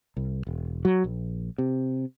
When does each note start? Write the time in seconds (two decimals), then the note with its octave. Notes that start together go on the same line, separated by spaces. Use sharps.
0.17 C2
0.47 E1
0.85 F#3
1.04 A#1
1.58 C3